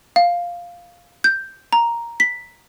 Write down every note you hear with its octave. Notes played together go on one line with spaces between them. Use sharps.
F5
G6
A#5
B6